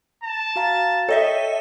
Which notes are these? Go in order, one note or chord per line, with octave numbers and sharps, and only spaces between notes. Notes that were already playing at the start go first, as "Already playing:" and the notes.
A5
F#4 F5 A#5
A4 C#5 D#5 E5 G5